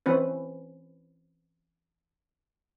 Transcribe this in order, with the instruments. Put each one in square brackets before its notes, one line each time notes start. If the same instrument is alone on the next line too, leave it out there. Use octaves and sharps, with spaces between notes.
[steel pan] E3 C4 C#4 B4